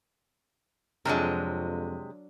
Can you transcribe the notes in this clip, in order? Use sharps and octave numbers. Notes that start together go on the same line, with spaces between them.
F2 C3 F#3 G#3 D4 A#4